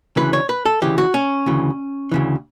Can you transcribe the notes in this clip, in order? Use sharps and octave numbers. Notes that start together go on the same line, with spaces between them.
D2 C#3 E3 B4
C#5
B4
A4
D2 C#3 E3 G4
F#4
C#4
D2 C#3 E3
D2 C#3 E3